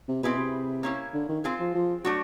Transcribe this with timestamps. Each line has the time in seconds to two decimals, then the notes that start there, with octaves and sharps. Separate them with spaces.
0.09 C3
0.23 B2 C4 E4 G#4 B4
0.38 C3
0.83 A#3 C#4 E4
1.14 D3
1.29 D#3
1.44 C4 F4 G#4
1.60 F3
1.75 F3
2.05 F#3 A3 D4 F#4